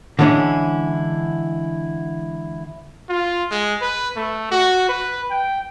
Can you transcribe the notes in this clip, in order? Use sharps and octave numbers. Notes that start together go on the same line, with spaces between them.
D3 E3 G#3 C#4 E4
F4
G#3
B4
A3
F#4
B4
G5